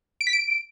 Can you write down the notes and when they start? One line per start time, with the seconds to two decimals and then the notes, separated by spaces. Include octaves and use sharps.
0.21 D7
0.27 B6
0.33 D7